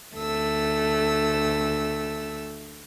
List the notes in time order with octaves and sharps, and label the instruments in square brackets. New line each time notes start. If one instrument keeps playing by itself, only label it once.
[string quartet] D2 A3 E6